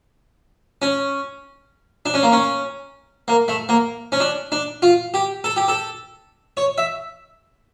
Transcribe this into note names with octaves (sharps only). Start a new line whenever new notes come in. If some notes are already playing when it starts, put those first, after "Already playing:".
C#4
D4
C#4
A#3
C#4
A#3
A3
A#3
C#4
D4
D4
F4
G4
A4
G4
A4
C#5
E5